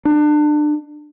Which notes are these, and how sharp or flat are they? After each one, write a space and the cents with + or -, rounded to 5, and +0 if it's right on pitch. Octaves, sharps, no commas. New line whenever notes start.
D4 +30